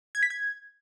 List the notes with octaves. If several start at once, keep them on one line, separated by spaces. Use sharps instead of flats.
G#6
B6
G#6